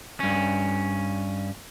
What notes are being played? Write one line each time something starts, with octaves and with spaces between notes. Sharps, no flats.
G2 C#4